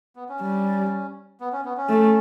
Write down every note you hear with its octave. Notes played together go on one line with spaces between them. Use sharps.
B3
C#4
G3
B3
C#4
B3
C#4
A3